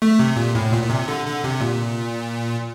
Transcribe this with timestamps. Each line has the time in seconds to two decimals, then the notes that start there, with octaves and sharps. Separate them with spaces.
0.02 A3
0.19 C3
0.36 A#2
0.55 A2
0.73 A#2
0.83 A#2
0.90 C3
1.08 D3
1.26 D3
1.44 C3
1.61 A#2